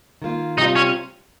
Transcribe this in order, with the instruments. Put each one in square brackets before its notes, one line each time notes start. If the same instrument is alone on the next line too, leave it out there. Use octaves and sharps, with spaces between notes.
[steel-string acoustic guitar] D#3 A#3 F4
[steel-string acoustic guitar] C3 G3 C4 F4 [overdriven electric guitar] D#4
[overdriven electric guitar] C#4